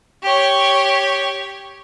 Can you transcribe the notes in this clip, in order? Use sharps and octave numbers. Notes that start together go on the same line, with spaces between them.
G4 C#5